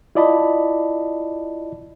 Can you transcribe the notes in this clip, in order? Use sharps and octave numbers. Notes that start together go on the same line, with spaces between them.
E4 F4 D5 D#5 A5 B5